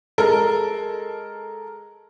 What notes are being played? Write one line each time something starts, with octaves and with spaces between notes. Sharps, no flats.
G#3 A4 A#4